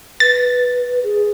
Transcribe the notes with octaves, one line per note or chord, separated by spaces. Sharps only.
B4 A6
G#4